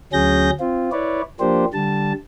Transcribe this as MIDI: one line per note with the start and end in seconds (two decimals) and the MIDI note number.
0.13 0.50 38
0.13 0.50 54
0.13 0.50 61
0.13 0.50 68
0.13 0.50 91
0.13 0.50 94
0.60 0.90 60
0.60 0.90 65
0.92 1.22 64
0.92 1.22 71
0.92 1.22 73
0.92 1.22 74
1.40 1.65 53
1.40 1.65 58
1.40 1.65 62
1.40 1.65 67
1.40 1.65 72
1.73 2.13 50
1.73 2.13 55
1.73 2.13 81